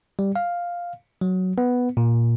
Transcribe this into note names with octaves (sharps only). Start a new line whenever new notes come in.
G3
F5
F#3
B3
A#2